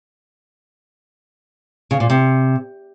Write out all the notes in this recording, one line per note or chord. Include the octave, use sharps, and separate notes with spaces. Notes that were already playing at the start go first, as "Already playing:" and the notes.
C#3
A#2
C3